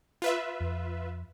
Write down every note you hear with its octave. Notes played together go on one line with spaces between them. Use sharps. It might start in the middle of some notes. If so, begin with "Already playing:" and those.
F4 B4 E5
F2